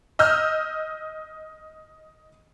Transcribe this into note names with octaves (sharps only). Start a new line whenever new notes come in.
D#5 E6 F6 G6